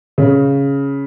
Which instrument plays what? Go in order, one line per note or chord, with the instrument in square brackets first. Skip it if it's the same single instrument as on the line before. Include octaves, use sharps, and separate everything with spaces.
[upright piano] C#3